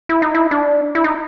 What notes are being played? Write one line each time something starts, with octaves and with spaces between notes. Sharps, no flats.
E4
D#4
E4
D4
E4
D#4